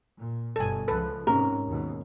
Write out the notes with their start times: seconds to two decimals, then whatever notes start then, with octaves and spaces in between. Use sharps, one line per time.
0.19 A#2
0.56 G1 B2 A4 G#5
0.88 C#2 F3 A4 B4
1.27 G#2 C3 C#4 A#4
1.67 D#2 G#2 B2